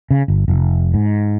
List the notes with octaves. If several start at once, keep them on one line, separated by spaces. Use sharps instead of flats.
C#3
G1
F1
G#2